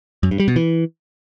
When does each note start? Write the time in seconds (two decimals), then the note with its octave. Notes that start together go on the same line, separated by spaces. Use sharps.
0.23 F#2
0.31 G2
0.40 G3
0.48 B2
0.56 E3